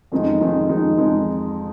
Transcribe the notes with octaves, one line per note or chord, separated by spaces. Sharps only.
F2 D#3 G#3 D#4
F2 D#3 G#3 D#4
F2 D#3 G#3 D#4
F2 D#3 G#3 D#4